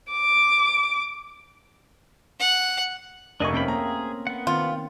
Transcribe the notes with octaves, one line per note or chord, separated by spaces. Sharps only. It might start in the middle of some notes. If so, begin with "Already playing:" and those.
D6
F#5
F1 A3 D4 A#4 D#5 E5 G#5 C#6
A#3 C4 C#4 G5 B5
A#3 G#4 A#5
B3 F#5
D#3 C4 F4